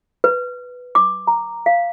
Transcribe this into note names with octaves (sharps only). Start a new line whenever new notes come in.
B4
D6
A#5
F5